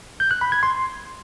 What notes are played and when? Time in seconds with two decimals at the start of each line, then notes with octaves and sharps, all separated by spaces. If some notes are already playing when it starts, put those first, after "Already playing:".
0.20 G6
0.31 F#6
0.41 B5
0.52 G#6
0.63 C6